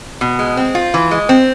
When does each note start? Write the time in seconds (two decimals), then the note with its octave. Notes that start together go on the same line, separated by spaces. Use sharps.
0.21 B2
0.39 G#3
0.57 C4
0.75 F4
0.94 E3
1.11 G#3
1.29 C4